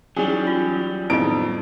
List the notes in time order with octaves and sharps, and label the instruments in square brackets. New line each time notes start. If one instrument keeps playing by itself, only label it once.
[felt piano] E3 C#4 D#4 [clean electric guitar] F#3 G3 [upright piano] G#4
[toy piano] F4
[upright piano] F2 D7 [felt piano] A2 D#3 B3 [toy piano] E4 D#5